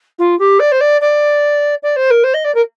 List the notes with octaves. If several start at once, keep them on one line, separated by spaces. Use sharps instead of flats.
F4
G4
D5
C5
D5
D5
D5
C5
A#4
C5
D#5
D5
A#4